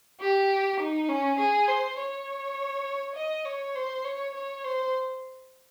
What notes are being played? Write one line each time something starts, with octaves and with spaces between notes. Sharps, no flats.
G4
D#4
C#4
G#4
C5
C#5
D#5
C#5
C5
C#5
C#5
C5